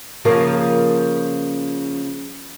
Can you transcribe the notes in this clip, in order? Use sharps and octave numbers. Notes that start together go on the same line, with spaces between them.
C#3 F3 A#3